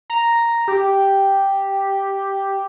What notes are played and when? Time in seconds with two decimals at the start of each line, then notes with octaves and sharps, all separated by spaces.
0.10 A#5
0.68 G4